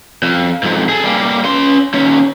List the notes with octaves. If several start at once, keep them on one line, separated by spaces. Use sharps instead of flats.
F2
F2 G#2
G#4 A4
G3 A#3
C#4 C6
D#2 C#4